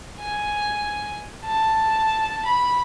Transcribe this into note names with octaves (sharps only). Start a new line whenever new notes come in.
G#5
A5
B5